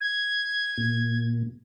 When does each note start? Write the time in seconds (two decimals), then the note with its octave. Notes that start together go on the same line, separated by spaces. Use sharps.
0.01 G#6
0.78 A#2